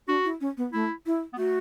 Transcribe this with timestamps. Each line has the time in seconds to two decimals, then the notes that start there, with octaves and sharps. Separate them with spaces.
0.08 D4 F#4
0.25 E4
0.41 C#4
0.57 B3
0.73 A3 E4
1.06 E4
1.33 B3
1.38 A3 F#4